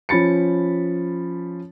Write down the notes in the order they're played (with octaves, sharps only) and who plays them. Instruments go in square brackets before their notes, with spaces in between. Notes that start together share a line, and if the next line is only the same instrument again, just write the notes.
[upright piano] F3 C#4 B5 A6 C#7